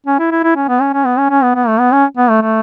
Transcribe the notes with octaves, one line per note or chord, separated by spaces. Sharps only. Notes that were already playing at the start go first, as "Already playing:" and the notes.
C#4
E4
E4
E4
C#4
B3
C#4
C#4
B3
C#4
C#4
B3
B3
A3
B3
C#4
B3
A3
A3